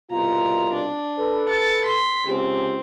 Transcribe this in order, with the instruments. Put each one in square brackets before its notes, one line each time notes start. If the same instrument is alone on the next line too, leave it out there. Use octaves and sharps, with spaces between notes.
[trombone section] C2 B2 F4 [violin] A#5
[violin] D4
[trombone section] A4 B4
[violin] A6 C#7
C6 B6
[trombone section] C#2 G4 [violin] C4